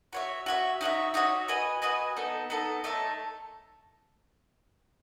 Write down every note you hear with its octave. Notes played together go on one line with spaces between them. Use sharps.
F#4 C#5 E5
F#4 C#5 E5
D#4 F#4 C#5 E5
D#4 F#4 C#5 E5
F#4 B4 D#5 G#5
F#4 B4 D#5 G#5
B3 D#4 A4
B3 D#4 A4
A3 D#4 A4 C#5